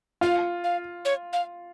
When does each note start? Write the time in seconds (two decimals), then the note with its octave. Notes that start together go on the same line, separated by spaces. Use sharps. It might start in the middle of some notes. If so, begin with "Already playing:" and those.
0.21 F4 F5
0.64 F5
1.05 C#5
1.33 F5